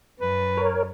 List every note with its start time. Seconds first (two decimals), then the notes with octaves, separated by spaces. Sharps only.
0.20 F#2 B4
0.57 A#4 C#5